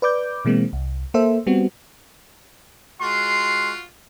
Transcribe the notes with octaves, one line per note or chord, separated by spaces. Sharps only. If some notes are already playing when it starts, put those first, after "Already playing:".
B4 D5 D6 G6
B2 E3 G#3 A#3 C4
C2
A#3 A4 C5 E5
G3 B3 C4 F#4
G#3 F4 F#4 C6